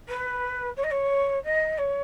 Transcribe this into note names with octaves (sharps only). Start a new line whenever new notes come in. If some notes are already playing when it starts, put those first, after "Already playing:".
B4
C#5
D#5
C#5
D#5
C#5